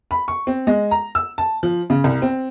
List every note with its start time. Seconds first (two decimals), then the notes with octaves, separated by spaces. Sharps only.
0.11 B5
0.28 C#6
0.47 C4
0.67 G#3
0.91 A#5
1.15 E6
1.38 A5
1.63 F3
1.90 C#3
2.04 C2
2.22 C4